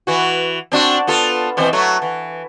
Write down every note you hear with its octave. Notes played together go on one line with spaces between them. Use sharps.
E3 F#4
C4 D4 F#4
B3 F4 A4
B2 E3 C4
F#3 A3
E3